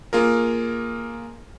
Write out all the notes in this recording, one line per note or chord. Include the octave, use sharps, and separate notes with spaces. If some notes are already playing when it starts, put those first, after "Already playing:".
A#3 F4 G#4 A#4